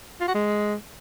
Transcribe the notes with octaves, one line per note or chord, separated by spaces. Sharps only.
F4
F#4
G#3